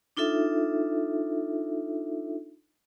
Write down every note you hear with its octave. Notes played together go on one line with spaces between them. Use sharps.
D4 D#4 F4 A4 E5